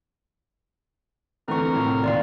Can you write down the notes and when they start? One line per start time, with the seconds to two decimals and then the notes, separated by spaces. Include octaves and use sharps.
1.48 D3 E3 A3 C4 A#4 C#6
1.73 A2 C3 F3
2.04 D#2 A#2 D5 F5 C6